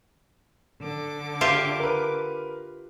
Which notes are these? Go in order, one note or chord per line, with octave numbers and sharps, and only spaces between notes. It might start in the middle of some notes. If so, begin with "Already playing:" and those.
D3 D6
F4 G4 E5
A#4 B4